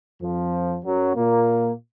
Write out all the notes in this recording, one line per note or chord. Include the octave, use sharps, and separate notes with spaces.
F2 F3
F#2 F#3
A#2 A#3